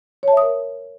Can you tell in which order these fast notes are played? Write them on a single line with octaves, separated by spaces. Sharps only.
C#5 A5 E5 D#6 A#4